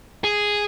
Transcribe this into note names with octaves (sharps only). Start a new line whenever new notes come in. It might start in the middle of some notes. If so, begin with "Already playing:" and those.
G#4